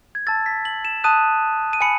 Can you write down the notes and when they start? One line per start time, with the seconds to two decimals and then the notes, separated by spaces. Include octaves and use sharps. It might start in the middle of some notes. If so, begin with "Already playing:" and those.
0.15 G#6
0.27 A5 E6 A6
0.46 B6
0.65 F#7
0.85 E7
1.04 A5 D#6 F#6 D#7
1.73 D#7
1.81 G#5 B5 C#7